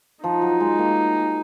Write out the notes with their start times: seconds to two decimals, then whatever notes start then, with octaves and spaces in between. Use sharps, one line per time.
0.24 F3 D#4
0.42 F#3
0.60 G#3
0.79 A#3